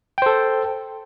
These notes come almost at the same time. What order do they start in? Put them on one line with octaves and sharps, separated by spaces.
G5 C5 A4